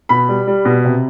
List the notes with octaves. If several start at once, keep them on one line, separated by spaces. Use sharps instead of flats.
B2 B5
G3
G3
B2
C3